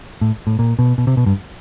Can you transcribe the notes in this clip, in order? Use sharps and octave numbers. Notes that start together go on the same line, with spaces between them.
A2
A2
A#2
B2
B2
C3
B2
G2